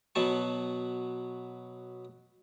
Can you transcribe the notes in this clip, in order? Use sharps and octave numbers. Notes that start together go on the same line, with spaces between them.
B2 F#3 B3 A5 C#6